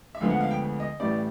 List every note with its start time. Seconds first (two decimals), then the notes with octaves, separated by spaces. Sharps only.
0.15 E5
0.20 D2 D3 F3 G#3 B3 F5
0.30 F#5
0.41 F5
0.51 G5
0.80 D#5
1.00 A1 A2 E3 G3 D5